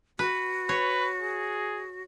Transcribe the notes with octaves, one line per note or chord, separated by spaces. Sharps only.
F#4 B4
B4 C#5
G#4